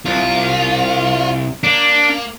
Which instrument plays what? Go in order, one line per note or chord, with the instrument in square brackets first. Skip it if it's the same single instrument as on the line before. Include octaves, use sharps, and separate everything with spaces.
[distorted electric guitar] C2 [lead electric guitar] F4
[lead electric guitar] A#3 [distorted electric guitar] D4